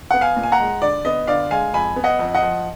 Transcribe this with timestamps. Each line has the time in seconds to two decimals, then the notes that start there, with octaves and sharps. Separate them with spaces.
0.11 B3 F#5
0.21 F5 G#5
0.37 A#2
0.43 G#5
0.52 F#5 A#5
0.60 G#3
0.82 D3 D5
1.05 B3 D#5
1.27 D3 D5 F5
1.51 G#3 F5 G#5
1.74 F2 G#5 B5
1.96 B3
2.04 D#5 F#5
2.19 F2
2.35 D#5 F#5
2.42 F3